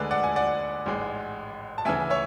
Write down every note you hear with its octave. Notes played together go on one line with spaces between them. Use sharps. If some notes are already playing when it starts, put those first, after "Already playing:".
Already playing: D2 D3 G#3 B4 D5
D5 F#5
G#5
D5 F#5
A1 G#2 G#3
A5
D2 C#3 E3 E5 G#5
C#5 E5